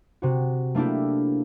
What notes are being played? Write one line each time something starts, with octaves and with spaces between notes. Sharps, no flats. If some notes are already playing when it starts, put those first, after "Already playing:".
C3 F#4
A3 A#3 D4 E4 G4